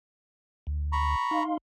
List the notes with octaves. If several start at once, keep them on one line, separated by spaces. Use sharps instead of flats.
D2
A#5 B5 C#6
D#4 F5 C6